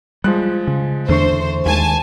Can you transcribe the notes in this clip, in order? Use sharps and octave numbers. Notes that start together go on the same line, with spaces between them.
F3 G3 G#3 F#6
C#3
E2 D3 A3 D4 C5 C#6
D#2 D#3 G#3 G#5 A5